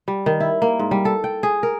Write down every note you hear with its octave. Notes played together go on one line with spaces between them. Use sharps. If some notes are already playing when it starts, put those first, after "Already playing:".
G3
D#3
E4
A#3
G#2
G3
A4
G5
G#4
A#4